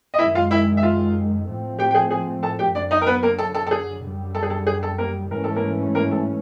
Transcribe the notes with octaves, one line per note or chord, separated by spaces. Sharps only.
D#5
F#2 D#3 G#3 E4 E5
F4 F5
E4 E5
E5
F4 F5
A2 F3 A3 C4
G4 G5
G5
G#4 G#5
G#4 G#5
A4 A5
G4 G5
F#2 D3 F#3 D4 D5
D#4 D#5
A#4
B3 B4
A#3 A#4
A4
A4
A4
G#4
F#2 D3 G3
A4
G#4
A4
G#4
A4
A#3 A#4
G#2 E3 A3 C#4 A#4
A4
A#3 A#4
A#3 A#4
A4